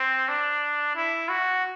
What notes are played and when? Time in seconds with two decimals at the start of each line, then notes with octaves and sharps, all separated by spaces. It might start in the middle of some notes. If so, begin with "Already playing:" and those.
Already playing: C4
0.29 D4
0.96 E4
1.29 F#4